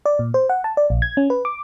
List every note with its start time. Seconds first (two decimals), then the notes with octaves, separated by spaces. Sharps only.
0.06 D5
0.19 A#2
0.34 C5
0.49 F#5
0.64 A5
0.77 D5
0.90 A#1
1.02 G#6
1.17 C#4
1.30 B4
1.45 D6